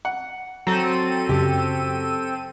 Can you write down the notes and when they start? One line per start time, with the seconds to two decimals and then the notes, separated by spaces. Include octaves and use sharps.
0.05 F#5
0.67 F#3 C4 A4 A#5 D#7
1.29 F#2 C#3 G4